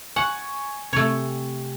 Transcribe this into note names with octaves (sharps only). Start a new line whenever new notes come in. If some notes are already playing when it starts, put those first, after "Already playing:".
F#5 G#5 C#6
C3 A3 C#5